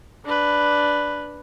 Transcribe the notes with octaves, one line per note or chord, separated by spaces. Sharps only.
D4 B4